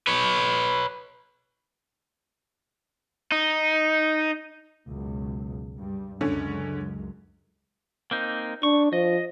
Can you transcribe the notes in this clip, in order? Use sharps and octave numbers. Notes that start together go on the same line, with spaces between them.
B4 C#5
D#4
C#2 F#2 B2
G2 G3
C#2 F#2 D3 G#3 C#4
A#3 C4 D#4
D4 C#6
F3 D#5